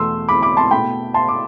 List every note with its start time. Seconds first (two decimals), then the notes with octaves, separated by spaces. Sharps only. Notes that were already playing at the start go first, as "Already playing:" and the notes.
Already playing: E2 B2 A3 C6 E6
0.28 B5 D6
0.42 B5 D6
0.57 A5 C6
0.71 B2 A3 G5 B5
1.14 A5 C6
1.28 D6